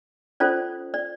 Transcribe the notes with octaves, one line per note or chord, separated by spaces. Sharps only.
C#4 F4 A4 C5 D5
D5